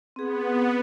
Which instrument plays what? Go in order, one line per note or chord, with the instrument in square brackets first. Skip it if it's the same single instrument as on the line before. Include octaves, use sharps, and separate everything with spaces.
[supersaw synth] B3 [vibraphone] C4 G#4